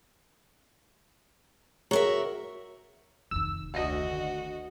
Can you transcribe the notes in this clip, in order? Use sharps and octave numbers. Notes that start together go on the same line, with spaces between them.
F#4 G#4 A#4 C#5 E5 A#5
F1 D#3 E6
D2 F#4 D#5